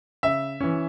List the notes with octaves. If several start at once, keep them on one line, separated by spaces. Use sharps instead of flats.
C#3 E5
E3 C#4